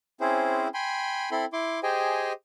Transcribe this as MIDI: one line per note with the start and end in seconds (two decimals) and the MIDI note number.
0.20 0.68 60
0.20 0.68 61
0.20 0.68 64
0.20 0.68 68
0.20 0.68 72
0.74 1.30 79
0.74 1.30 80
0.74 1.30 83
0.74 1.30 84
1.31 1.45 60
1.31 1.45 64
1.31 1.45 69
1.31 1.45 83
1.31 1.45 84
1.53 1.80 64
1.53 1.80 84
1.53 1.80 86
1.83 2.33 67
1.83 2.33 68
1.83 2.33 72
1.83 2.33 75
1.83 2.33 79
1.83 2.33 80